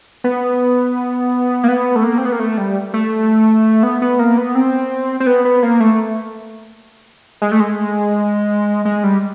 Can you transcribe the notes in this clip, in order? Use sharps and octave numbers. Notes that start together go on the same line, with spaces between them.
B3
A#3
B3
A3
A#3
C4
B3
A#3
A3
G3
A3
B3
B3
A#3
B3
C4
C4
B3
B3
A#3
A3
G#3
A3
G#3
G#3
G3